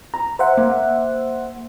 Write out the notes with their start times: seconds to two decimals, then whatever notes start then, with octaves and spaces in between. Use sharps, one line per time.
0.14 A#5
0.39 C5 E5 F#5
0.57 A#3